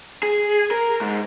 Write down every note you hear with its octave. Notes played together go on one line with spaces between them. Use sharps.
G#4
A#4
G#2